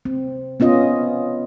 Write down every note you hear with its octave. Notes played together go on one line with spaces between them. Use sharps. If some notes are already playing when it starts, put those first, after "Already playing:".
C4
B3 C#4 F4 D#5